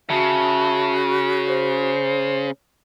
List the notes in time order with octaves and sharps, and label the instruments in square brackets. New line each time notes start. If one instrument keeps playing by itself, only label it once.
[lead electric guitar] C#3 [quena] F#4 [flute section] E5 A5
[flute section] C5